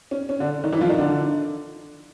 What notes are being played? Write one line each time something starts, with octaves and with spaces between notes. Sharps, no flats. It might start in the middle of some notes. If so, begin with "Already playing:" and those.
C#4
C#4
D3 D4
D#3 D#4
E3 E4
F3 F4
D#3 D#4
D3 D4